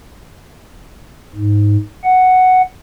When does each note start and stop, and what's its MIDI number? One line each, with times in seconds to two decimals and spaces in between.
1.35 1.77 44
2.04 2.62 78